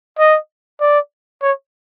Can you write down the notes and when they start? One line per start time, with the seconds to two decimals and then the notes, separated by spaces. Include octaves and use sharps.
0.19 D#5
0.81 D5
1.43 C#5